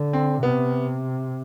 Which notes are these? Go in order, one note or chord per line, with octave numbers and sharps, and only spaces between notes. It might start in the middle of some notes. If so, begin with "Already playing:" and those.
Already playing: D3
C4
C3 B3